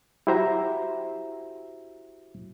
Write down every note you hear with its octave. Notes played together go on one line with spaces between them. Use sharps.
E4 F#4 G4 C5 E5 A#5